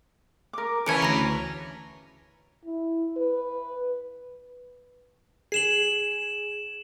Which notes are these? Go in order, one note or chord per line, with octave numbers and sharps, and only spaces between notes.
A#4 D6
C#3 E3 C#4 A5 B5 G#6 C#7 D7
D2 A#5 A#6
E4
B4
G#4 C7 E7 F#7